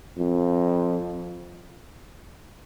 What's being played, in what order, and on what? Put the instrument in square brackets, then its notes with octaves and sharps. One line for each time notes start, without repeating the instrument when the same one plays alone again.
[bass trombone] F2